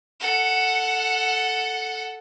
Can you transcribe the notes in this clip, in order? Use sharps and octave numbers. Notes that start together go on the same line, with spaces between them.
A4 F#5